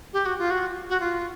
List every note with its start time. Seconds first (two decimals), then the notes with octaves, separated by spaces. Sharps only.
0.13 G4
0.26 F#4
0.38 F4
0.51 F#4
0.90 F#4
1.00 F4